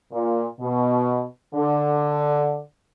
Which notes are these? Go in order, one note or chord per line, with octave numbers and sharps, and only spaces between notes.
A#2
B2
D3